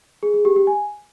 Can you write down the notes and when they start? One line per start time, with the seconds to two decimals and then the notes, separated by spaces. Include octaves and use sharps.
0.23 G#4
0.34 G#4
0.45 G4
0.56 G4
0.67 G#5